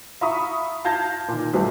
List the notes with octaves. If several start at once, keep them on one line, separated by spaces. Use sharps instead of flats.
E5 F5 A#5 B5 C#6 D#6
F5 A5 G6 G#6 A#6
A#2 D#3
B1 G2 A3 B3 G4 C5